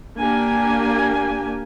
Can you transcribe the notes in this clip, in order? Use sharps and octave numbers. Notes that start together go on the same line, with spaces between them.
A#3 D4 G4 G#5